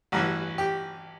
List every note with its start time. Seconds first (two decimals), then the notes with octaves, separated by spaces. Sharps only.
0.12 A1 G2 E3 F#4
0.58 G4